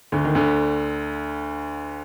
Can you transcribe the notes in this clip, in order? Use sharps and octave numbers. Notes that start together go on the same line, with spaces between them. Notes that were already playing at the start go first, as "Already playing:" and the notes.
D2 D3
D#3
D2 D3